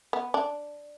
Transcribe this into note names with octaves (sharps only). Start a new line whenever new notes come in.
B3
D4